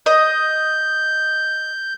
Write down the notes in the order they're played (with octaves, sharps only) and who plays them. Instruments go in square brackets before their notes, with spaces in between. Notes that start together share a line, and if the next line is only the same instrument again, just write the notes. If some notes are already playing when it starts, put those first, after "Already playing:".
[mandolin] D#5 [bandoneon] G6